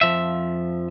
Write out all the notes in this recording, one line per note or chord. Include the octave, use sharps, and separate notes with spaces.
F2 F3 E5